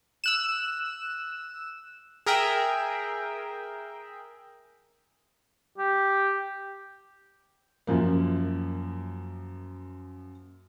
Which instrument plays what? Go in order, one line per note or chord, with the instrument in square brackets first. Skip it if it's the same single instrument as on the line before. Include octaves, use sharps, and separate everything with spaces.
[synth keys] E6 F#6 E7
G#4 A#4 E5 G5
[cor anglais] G4
[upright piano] F#2 F3 A#3